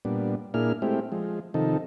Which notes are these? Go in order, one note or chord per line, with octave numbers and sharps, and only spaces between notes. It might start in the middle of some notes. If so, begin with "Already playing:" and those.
A#2 G3 B3 D4
A#2 A#3 D4 E4 G#4 F6
G#3 A3 C4 E4 G4
F3 G#3
C3 D#3 F3 D#4 A4